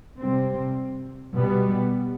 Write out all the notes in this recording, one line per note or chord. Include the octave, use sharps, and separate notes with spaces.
C3 G3 C4
B2 G3 B3